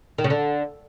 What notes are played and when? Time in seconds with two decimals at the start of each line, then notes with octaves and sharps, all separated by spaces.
0.18 D#3
0.24 C#3
0.30 D3